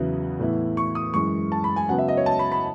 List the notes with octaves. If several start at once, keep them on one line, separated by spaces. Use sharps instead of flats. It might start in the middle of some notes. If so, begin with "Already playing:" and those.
Already playing: E2 C#3 F#3 B3 E4
A2 E3 B3 E4
C#6
D#6
F#2 E3 G#3 C#6
A5
B5
G#5
C#3 F#3 B3 F#5
E5
D#5
C#5
A5
B5
B5